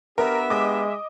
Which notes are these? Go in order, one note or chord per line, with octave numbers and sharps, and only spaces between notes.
B3 D4 G4 A#4 E5
G#3 D#5 D6